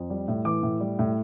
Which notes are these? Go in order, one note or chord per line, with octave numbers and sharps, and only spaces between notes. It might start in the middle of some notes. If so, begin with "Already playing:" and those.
Already playing: F2
G3
A2
E3 D6
A2
G3
A2